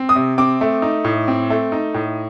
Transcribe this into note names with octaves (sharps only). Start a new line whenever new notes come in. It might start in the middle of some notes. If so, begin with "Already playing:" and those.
Already playing: C4
D#6
C3
C4 D6
A3
D#4
A2
C4
A3
D#4
A2